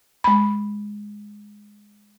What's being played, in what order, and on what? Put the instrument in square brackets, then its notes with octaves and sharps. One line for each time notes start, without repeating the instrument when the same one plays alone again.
[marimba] G#3 B5